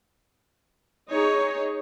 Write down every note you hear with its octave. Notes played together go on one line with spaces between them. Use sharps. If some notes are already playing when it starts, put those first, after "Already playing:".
D#4 G#4 C#5